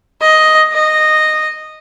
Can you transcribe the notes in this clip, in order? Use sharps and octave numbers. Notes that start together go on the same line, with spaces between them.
D#5
D#5